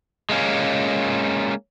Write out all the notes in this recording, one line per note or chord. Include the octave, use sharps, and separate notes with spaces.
G#3 A#3 C#4